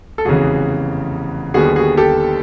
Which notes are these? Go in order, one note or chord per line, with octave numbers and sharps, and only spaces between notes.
A4
F1 E2 C#3 E3 F#4 G#4
D#2 D3 G3 B3 F#4 G#4
F#4 G#4
G4 A4